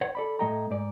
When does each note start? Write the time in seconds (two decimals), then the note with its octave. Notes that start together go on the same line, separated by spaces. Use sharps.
0.01 C5 C#5 F#5
0.15 A4 D5 B5
0.39 A2 A3 A4 D#5 G5 A#5
0.71 G#2 D5